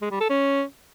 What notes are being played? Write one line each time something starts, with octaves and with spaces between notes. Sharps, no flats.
G#3
G3
A4
C#4